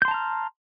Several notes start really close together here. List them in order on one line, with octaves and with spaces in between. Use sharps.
G6 C6 A5 A#5 F6